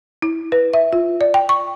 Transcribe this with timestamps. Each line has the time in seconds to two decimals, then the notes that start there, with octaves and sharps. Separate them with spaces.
0.22 E4
0.52 B4
0.73 E5
0.93 F4
1.21 D5
1.34 G5
1.49 C#6